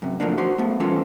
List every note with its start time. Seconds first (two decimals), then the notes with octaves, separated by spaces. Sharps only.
0.02 F#2 C3
0.20 F3 F#3 A3 A#3 D4
0.38 F#4 C5 C6
0.58 A3 B3
0.80 E3 G3 C#4 F4 A4 C5